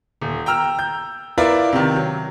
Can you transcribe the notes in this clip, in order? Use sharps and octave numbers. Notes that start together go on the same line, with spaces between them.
D#1
G5 A#5 E6 F6
G6
E4 F4 A#4 B4 D5 E5
C3 D#3
F#3